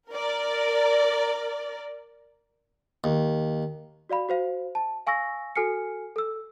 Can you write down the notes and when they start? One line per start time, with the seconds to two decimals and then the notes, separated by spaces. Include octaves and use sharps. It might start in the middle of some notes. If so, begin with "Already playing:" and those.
0.11 A#4 D5
3.04 D#2
4.09 F#4 D5 F5 B5
4.29 F#4 C5 F5
4.75 A5
5.07 F5 G#5 C#6 E6 A#6
5.56 F#4 A4 G#5 F6 C7 C#7
6.16 A4 E6